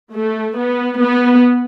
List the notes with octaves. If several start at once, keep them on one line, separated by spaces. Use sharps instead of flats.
A3
B3
B3